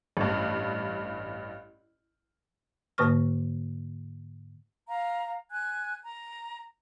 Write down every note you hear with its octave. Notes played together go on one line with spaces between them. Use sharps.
A1 G2
G#2 D3 A#3 B4 C#6 F6
F5 A#5
G#5 F#6 G#6
A#5